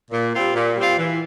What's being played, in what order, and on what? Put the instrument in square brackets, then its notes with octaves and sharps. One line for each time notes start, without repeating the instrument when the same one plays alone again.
[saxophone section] A#2
G3 C4 F4
A#2
G3 C4 F4
E3